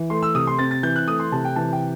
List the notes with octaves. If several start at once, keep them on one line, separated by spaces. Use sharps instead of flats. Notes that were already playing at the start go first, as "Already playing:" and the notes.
Already playing: E3
A3 C6
E6
C3 D#6
C6
C4 A6
A6
E3 G6
F#6
A3 D#6
C6
C3 A5
G5
E3 A5
G5